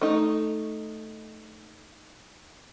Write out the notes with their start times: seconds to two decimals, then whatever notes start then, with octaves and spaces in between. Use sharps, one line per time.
0.01 A3 D#4